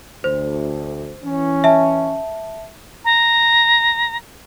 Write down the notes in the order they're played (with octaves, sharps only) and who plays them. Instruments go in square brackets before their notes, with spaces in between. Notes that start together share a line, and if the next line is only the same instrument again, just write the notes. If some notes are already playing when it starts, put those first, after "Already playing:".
[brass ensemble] D2 [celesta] C5
[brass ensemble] E3 C#4
[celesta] E5 A5
[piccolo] A#5